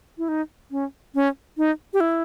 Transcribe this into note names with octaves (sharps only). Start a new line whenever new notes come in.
E4
D#4
C#4
C#4
D#4
G4
E4